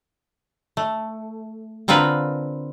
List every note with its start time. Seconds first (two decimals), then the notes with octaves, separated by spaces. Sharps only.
0.77 A3
1.88 D3 C4 F4 A#4 B4